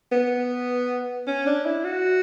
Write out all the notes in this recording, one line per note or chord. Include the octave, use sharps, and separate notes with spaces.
B3
C#4
D4
E4
F#4